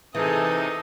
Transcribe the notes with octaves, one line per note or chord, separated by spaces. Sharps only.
C3 E3 D#4 G#4 A4 D#6